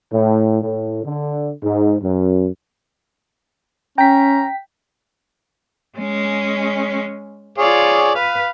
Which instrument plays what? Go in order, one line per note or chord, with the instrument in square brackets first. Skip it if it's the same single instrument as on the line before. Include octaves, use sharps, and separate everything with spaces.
[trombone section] A2
A2
D3
G#2
F#2
[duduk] C#4 [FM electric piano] G5 B6 [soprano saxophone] A#5
[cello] G#3 C#4
[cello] F4 [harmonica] G#4 C#5 D5
[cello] B4 [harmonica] F5